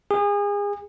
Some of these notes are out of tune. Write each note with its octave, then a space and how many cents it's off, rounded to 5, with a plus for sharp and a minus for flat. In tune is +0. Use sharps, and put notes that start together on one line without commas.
G#4 -30